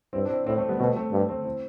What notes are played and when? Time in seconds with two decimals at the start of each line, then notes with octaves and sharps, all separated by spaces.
0.13 G2 C4 E4
0.25 D4
0.30 C4 E4
0.46 A2 C4 E4
0.57 A3 C4
0.69 G3 B3
0.79 B2 A3 C4
0.96 A3 C4
1.12 G2
1.29 A3 C4
1.45 C4 E4